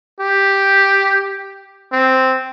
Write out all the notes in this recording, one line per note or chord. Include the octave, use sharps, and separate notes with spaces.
G4
C4